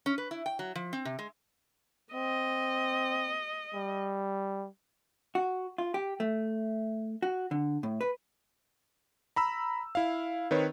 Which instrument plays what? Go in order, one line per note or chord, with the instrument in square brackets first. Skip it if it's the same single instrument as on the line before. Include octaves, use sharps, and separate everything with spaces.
[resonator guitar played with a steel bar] C#4
B4
E4
G5
F#3
F3
C4
C3
G#3
[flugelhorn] C4 [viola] D#5
[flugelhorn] G3
[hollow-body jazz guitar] F#4
F4
G4
A3
F#4
D3
A2
B4
[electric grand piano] A#5 B5 E6
E4 F5
D#3 C4 B4 C#5